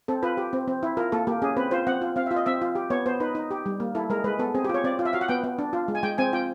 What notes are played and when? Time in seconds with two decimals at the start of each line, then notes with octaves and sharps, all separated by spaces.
0.08 C4 A4
0.23 F4 B4
0.37 G4
0.53 C4
0.68 C4
0.83 E4
0.97 F4 A#4
1.12 A#3 A4
1.27 A#3 G4
1.42 C#4 G#4
1.57 C4 B4
1.71 F4 C5
1.87 C4 F#5
2.02 F4
2.16 C4 F5
2.26 E5
2.31 F4
2.36 D#5
2.46 C4 E5
2.61 F4
2.75 G4
2.90 B3 C#5
3.06 B3 C5
3.20 D#4 B4
3.35 D#4
3.51 G4
3.66 G3
3.80 A#3
3.95 E4 A4
4.10 G#3 A#4
4.24 G#3 B4
4.39 B3 A4
4.55 C4 G#4
4.65 G4
4.69 F4
4.74 C#5
4.84 C4 D5
4.99 F4
5.05 E5
5.13 F#4 F5
5.21 F#5
5.28 B3 G5
5.44 B3
5.59 D4
5.73 F4
5.88 G#3
5.95 G#5
6.03 G#3 G5
6.18 C4 G#5
6.33 F4 G5